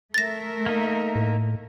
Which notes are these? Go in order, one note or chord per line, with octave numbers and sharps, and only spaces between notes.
A3 A#4 E5 A6 A#6
A#3 D#4
A2